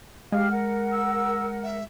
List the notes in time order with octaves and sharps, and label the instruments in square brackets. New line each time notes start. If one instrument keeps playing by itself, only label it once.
[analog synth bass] G#3 [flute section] G4 F5 F6
[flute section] A#4 F#5
[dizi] E6
E5